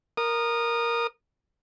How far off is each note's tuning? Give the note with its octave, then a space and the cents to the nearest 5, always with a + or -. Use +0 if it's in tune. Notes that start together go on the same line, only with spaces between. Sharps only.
A#4 +5 D#6 -20